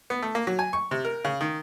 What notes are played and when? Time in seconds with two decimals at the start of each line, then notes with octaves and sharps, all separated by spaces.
0.10 B3
0.22 A3
0.35 A#3
0.47 F#3
0.59 G#5
0.73 C#6
0.91 C3
1.05 A#4
1.25 C#3
1.41 D#3